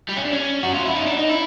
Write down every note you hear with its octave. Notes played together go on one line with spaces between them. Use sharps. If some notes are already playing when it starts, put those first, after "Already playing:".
G3
C#4
D4
C#4
F#4
F4
E4
D#4
D4
D#4
E4